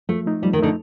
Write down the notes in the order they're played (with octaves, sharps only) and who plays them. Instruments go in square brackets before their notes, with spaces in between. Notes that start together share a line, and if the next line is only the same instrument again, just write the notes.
[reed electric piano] F3 [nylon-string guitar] A3
[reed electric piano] A3 D#4
[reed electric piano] F3 [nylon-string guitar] G3
[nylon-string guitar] D#3
[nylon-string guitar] D3 [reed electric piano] A3 D#4